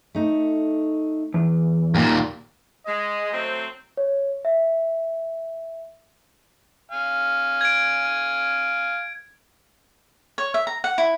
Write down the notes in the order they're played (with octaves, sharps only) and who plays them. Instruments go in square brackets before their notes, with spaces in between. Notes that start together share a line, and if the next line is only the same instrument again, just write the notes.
[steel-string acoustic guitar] A3 D#4
[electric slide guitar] E2
[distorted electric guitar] D#2 A#2 [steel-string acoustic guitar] A#3 G4
[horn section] G#3 [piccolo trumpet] D#5
[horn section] F#3 A3 C4
[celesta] C#5
E5
[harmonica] F5 G#5
[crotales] G#6 D7
[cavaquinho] C#5
E5
A#5
F#5
E4